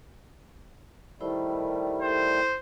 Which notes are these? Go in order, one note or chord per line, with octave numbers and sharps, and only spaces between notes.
D#3 G3 A3 E4 C5 B5
E4 A4 C5